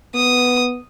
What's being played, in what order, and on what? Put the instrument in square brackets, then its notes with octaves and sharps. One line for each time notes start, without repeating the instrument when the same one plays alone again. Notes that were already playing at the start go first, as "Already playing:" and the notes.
[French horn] B3 [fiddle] D#6